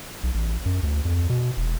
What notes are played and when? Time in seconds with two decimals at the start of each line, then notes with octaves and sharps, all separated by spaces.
0.23 B1
0.35 A1
0.66 F#2
0.83 D2
1.05 F2
1.30 B2
1.57 E1